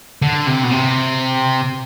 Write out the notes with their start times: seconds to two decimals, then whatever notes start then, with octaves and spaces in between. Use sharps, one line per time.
0.22 D3
0.47 C3
0.64 B2
0.71 C3